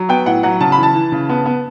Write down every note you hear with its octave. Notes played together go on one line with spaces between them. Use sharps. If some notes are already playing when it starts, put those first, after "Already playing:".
Already playing: F#3
B3 G5
A2 F#5
F#3 F#5
C#3 A5
B5
E3
A5
E3
C#3
B3
B3